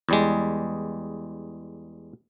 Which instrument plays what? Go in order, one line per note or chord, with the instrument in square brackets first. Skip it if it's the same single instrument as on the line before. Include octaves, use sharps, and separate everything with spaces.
[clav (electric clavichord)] E2 G3 G#3